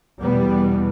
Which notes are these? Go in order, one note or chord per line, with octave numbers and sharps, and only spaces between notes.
E2 B2 G3 B3